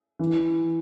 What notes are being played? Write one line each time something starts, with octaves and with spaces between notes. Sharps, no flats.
E3